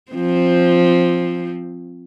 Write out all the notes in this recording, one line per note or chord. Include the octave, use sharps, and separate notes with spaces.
F3 C4